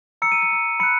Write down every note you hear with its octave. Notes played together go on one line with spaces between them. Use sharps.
A#5 E6 C#7
D#7
C#7
A#5 E6
B5 F#6 C#7